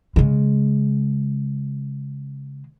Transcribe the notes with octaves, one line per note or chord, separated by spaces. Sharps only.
C#3 G#3